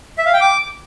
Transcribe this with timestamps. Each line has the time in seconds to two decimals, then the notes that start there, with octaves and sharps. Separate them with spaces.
0.18 E5
0.26 F5
0.33 G5
0.41 D6